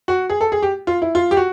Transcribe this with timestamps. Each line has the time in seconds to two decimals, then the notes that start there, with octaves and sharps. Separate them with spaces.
0.08 F#4
0.30 G#4
0.41 A4
0.52 G#4
0.63 G4
0.87 F4
1.02 E4
1.15 F4
1.31 G4
1.37 F#4